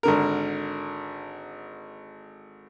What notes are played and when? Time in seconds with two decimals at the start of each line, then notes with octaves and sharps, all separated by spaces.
0.03 G#1 D3 A#4